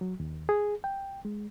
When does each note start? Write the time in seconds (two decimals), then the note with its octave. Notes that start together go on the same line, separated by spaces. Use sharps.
0.01 F#3
0.20 D#2
0.49 G#4
0.84 G5
1.25 G#3